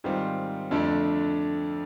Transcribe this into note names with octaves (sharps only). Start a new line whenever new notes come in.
G#2 D#3 G3 C4 F4
F2 D3 F3 A3 D4